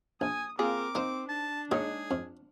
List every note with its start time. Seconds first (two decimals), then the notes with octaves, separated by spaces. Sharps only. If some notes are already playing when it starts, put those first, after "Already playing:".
0.21 A#1 G#5 D#6
0.59 A#3 C4 F4 G#4 A#4 D6
0.95 A#3 C4 D#4 C5 D#5
1.29 D4 A5
1.71 A#2 G#3 D#4 G#4 C#5
2.11 F2